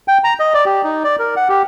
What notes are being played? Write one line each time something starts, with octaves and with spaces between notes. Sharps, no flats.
G5
A#5
D#5
D5
G4
D#4
D5
A#4
F#5
G4